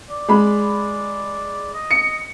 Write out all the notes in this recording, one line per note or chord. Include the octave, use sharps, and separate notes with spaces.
D5
G#3 B5
D#5
C#7